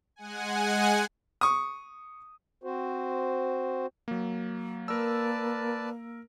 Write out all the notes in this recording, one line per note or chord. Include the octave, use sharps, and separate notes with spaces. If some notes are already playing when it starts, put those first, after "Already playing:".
G#3 F#5 G#5
C#6 D#6
C4 F#4 C5
F#3 A#3
A#3 A#4 B4 D5 A5 E6